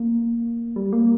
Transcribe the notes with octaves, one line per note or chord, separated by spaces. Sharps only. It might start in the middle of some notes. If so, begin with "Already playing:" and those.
Already playing: A#3
G3
A#3